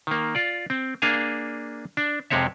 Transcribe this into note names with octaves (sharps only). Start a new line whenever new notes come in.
D#3 A#3
F4 D5
C4
A#3 D4 G#4 F5 G#5
D4
F2 C3 G#3 C4 C#5 E5